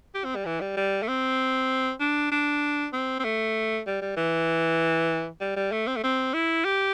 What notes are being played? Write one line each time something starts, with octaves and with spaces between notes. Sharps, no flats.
G4
C4
G3
E3
G3
G3
A3
C4
D4
D4
C4
C4
A3
G3
G3
E3
G3
G3
A3
C4
A3
C4
E4
G4